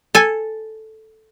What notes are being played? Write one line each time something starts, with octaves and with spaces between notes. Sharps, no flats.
A4 G#5